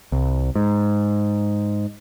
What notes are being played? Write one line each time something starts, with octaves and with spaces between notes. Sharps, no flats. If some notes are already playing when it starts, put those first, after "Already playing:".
C2
G#2